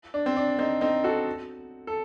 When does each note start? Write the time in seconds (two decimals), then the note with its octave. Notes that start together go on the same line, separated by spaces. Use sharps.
0.14 D4
0.26 C4
0.37 D4
0.59 C4 D#4
0.81 C4 D#4
1.04 F#4 A4
1.87 A4